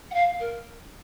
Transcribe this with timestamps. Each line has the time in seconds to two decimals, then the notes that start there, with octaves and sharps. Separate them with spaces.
0.11 F#5
0.14 F5
0.40 A#4